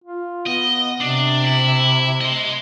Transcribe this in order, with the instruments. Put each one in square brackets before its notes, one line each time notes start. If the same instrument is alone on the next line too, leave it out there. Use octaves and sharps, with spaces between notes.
[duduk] F4
[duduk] B3 [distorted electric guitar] D#5
[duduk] C3 [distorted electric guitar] D4
[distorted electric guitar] E4
D#5 C6